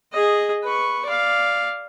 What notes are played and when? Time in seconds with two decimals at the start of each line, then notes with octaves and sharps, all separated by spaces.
0.13 G#4 D#5
0.64 B4 C#6
1.05 D5 F5